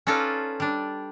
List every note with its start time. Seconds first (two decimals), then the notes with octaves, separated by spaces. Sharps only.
0.07 C#4 D#4 F4 A4 B4 D5
0.60 G3 D4